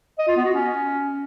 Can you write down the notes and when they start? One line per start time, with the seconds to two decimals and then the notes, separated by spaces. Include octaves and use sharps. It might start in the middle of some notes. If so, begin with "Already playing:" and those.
0.19 D#5
0.28 F4
0.36 B3
0.45 F#4
0.54 C#4